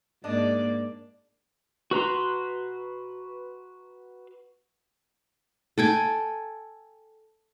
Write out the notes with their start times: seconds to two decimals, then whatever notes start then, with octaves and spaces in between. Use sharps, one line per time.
0.24 G#2 A#3 D4 D5 D#5
1.91 F#4 B4 A#5 C6
5.78 A4 G5 G#5